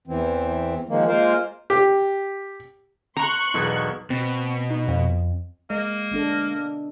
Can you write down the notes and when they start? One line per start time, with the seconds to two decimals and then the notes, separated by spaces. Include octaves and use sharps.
0.07 E2 E3 C4
0.89 D#3 F3 G#3 A#3
1.08 G#3 A#3 F4 A#4 C5 F5
1.70 G4
3.17 A#5 C6 C#6 F#6
3.54 E1 B1 B2
4.10 B2 C4
4.71 D#4
4.88 F2
5.70 G#3 A#3 D#5
6.12 B3 D4 A4